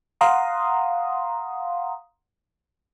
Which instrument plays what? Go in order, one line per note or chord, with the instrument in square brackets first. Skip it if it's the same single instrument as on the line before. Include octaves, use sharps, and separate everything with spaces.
[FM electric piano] F5 F#5 A#5 C6 D#6